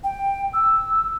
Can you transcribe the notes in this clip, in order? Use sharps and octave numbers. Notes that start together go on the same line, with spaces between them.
G5
E6